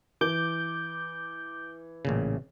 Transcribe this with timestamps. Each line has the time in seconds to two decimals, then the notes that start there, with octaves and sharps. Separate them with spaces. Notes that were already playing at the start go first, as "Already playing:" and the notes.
0.21 E3 D6 G6
2.05 A1 A#2 C#3